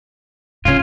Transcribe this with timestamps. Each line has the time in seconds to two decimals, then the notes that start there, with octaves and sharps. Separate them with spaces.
0.65 C#3 C#4 F4